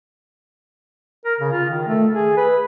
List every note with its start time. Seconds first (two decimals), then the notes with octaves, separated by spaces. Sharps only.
1.25 A#4
1.40 C#3
1.52 F4
1.69 D#3
1.87 A3
2.13 G#4
2.37 B4